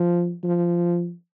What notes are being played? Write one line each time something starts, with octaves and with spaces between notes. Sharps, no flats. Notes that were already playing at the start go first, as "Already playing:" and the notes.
Already playing: F3
F3